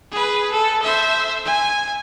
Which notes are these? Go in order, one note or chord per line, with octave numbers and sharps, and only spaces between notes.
G#4 B4
A4
C5 E5
G#5